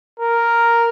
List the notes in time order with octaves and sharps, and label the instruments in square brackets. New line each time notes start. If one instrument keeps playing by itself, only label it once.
[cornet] A#4